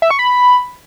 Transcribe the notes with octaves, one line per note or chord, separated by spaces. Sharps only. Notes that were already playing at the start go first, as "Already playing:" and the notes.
E5
C#6
B5